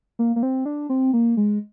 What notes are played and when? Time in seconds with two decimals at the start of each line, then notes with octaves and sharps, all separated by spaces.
0.19 A#3
0.36 A#3
0.43 C4
0.66 D4
0.90 C4
1.13 A#3
1.37 G#3